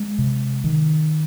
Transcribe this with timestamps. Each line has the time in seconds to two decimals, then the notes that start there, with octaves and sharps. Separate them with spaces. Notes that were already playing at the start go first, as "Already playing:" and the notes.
Already playing: G#3
0.18 C3
0.64 D#3